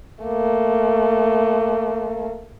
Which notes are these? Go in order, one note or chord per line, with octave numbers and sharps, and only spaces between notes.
A3 A#3